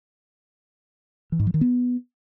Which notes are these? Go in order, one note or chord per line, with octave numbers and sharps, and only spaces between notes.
E3
G#2
F3
D#3
B3